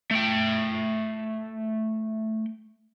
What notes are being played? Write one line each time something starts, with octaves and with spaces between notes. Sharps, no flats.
A3 G5